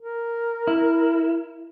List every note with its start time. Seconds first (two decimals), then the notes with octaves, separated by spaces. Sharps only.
0.01 A#4
0.67 E4